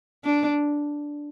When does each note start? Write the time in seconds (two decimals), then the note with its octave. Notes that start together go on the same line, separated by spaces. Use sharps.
0.24 D4